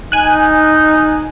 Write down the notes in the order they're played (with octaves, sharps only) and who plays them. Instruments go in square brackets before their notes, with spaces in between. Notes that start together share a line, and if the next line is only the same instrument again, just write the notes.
[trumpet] D#4 [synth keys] G#5 F#6